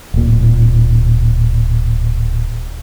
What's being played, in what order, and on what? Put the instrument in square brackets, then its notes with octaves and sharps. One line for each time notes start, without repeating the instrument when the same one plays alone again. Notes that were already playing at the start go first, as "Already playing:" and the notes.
[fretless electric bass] D1 A#2